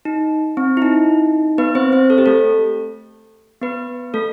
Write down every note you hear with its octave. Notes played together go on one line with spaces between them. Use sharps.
D#4
C4
E4
D#4
B3 B4
C4 C5
C4 C5
A4
G4
A3 A4
B3 B4
A3 A4